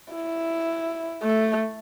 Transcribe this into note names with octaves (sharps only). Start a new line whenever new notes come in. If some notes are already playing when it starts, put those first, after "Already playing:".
E4
A3